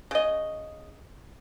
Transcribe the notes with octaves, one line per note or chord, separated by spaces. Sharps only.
C#3 D#5